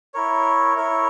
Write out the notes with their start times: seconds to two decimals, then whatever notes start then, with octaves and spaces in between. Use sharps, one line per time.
0.14 E4 A#4 C#5
0.76 E4 A#4 C#5